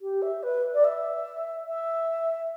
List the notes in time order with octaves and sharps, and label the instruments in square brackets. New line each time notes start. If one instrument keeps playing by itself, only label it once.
[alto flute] G4
E5
B4
D5
E5
E5